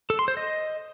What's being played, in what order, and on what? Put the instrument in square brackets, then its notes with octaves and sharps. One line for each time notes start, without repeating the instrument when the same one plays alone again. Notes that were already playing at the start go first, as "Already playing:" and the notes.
[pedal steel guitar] A4
C6
C5
D#5